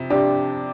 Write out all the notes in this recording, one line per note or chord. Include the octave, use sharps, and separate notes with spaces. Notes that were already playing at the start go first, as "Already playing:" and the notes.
Already playing: F2 C3
C3 D4 G4